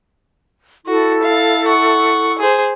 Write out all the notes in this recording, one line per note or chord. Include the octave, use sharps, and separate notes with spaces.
E4 F#4 A4
F5
F#5 C#6
G#4 C5